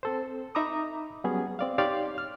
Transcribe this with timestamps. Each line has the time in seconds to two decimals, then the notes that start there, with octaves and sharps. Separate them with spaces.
0.03 C4 A4 C5
0.55 D#4 E5 A#5 B5 D6 D#6
1.24 F#3 G3 B3 C#4 G#4
1.59 C4 D5 F5
1.78 D#4 G4 C#5 D5 F5 C6
2.18 F6